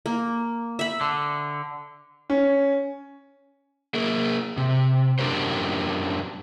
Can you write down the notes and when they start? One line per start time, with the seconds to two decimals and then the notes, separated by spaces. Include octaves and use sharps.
0.06 A#3
0.79 E5 B5
1.01 D3
2.30 C#4
3.94 A#3 G#4 A#4
4.57 C3
5.19 F#2 C#3 D4 G4 A#4 C5